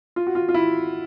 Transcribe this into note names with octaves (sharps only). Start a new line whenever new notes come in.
F4
F#4
F4
F4
E4